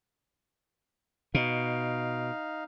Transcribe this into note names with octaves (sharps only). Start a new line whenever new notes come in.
B2 D#4 F5